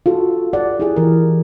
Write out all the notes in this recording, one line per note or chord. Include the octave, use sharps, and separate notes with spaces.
F4 F#4 A4
G4 D5 F#5
E4 G4 G#4
E3 A#4